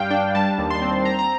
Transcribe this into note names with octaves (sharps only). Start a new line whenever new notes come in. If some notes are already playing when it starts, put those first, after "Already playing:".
Already playing: G2 G3 F5 G5
D4 G5
G3 A5
D#2
C6
C4
C4 A#5
A#5